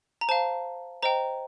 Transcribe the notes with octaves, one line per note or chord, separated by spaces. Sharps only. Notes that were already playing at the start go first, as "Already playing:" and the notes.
A#5
C5 F5 A5
C5 D#5 G5 A#5